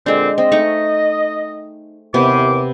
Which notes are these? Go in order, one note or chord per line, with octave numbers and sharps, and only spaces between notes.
A#2 D3 G#3 C4 D4
C4 D#5
A3 D#4 C#6
D#2 C3 E3 B3 D6